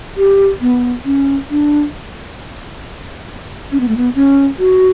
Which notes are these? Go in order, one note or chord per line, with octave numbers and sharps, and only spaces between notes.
G4
B3
C#4
D4
C#4
B3
A3
B3
C#4
F#4